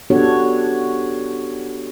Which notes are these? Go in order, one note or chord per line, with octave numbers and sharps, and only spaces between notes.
B3 D4 F#4 G4 A4 C#5